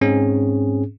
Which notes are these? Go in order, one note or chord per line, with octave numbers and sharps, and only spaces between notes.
G#2 C4 C#4 G#4